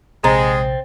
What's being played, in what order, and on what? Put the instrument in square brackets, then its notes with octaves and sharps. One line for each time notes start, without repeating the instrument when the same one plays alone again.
[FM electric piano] A#1 C3 A6 [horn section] G#3 [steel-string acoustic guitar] C4 [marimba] A#5